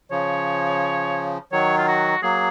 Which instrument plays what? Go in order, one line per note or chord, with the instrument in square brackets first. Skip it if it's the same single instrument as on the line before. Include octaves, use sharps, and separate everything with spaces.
[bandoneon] C#3 F3 [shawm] C#5
[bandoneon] D#3 F#3 [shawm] C#5
[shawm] F4
F#4
[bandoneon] F#3 A#3 [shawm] G#4